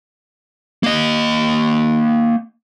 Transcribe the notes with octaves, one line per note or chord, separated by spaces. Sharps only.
A#3 D#5